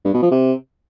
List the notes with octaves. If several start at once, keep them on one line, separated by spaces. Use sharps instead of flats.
G2
B2
F3
C3